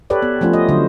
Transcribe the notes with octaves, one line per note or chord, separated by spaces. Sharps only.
G4 A4 B4 C#5 D5
B3
F3 A3 C#4 F4
D#5
D3 F#3 C5